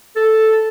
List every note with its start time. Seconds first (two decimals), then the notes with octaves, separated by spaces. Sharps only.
0.16 A4